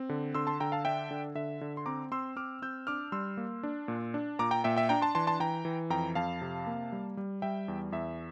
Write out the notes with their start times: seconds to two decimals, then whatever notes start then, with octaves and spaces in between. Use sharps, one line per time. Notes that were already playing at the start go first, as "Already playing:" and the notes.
Already playing: C4
0.09 D3
0.35 D3 C6 E6
0.47 A5 C6
0.60 D3 G5 A#5
0.72 F5 A5
0.85 D4 E5 G5
1.11 D3
1.35 D3 E5
1.61 D3
1.77 C6
1.86 C4 A#5 D6
2.12 C4 C6 E6
2.36 C4 D6 F6
2.62 C4 E6 G6
2.87 D4 D6 F6
3.12 G3 C6 E6
3.37 A#3
3.63 D4
3.88 A#2
4.14 D4
4.39 A#2 A#5 D6
4.51 G5 A#5
4.64 A#2 E5 G5
4.76 E5 G5
4.89 D4 G5 A#5
5.02 A5 C6
5.15 E3 A5 C6
5.27 A5 C6
5.40 E3 G5 A#5
5.65 E3
5.90 F2 G5 A#5
6.15 F2 F5 A5
6.41 C3
6.67 A#3
6.92 G3
7.17 G3
7.42 G3 E5 G5
7.68 E2
7.92 E2 E5